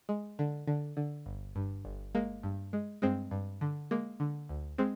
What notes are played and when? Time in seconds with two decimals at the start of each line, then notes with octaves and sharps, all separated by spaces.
0.09 G#3
0.39 D3
0.68 D3
0.97 D3
1.26 G1
1.56 G2
1.85 G1
2.15 G#3 A#3
2.43 G2
2.73 G#3
3.02 G2 G#3 C4
3.31 G2
3.61 D3
3.91 G#3 A#3
4.20 D3
4.49 D2
4.78 G#3 C4